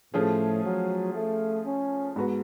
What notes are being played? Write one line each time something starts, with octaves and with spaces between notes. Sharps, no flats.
A2 F3 A3 C#4 F4 G#4
F#3
A3
C#4
G#2 G#3 B3 F#4 B4